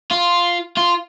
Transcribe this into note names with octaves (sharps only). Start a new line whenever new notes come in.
F4
F4